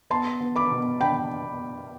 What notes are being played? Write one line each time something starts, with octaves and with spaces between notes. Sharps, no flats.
B3 A5 C6
B3
B5 D6
B2
D4 G5 B5